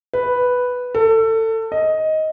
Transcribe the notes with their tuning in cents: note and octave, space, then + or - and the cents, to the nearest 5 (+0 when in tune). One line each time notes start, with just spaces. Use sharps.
B4 +0
A4 +25
D#5 +10